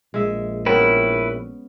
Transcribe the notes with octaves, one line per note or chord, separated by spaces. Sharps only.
A#1 G#3 E5
B3 C#4 E4 A#4 B4 C#5 G5